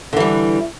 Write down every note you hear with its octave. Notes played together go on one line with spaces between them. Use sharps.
D3 E3 G3